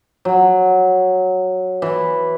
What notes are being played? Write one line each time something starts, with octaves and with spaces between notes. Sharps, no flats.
F#3
E3